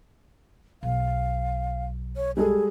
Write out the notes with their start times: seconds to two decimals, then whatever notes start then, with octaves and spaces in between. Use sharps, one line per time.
0.83 B1 F5
2.16 C#5
2.37 G3 G#3 G#4 A4